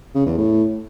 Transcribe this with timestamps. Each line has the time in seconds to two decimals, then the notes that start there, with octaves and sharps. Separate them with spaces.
0.15 C#3
0.26 E2
0.38 A2